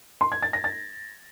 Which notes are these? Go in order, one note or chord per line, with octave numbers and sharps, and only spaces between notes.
C6
G#6
A6
A#6
A6